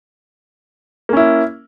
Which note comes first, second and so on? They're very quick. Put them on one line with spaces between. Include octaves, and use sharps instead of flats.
A#3 C#4 E4